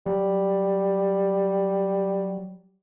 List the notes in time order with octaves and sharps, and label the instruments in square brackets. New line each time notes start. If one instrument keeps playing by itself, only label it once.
[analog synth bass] F#3 [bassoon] G3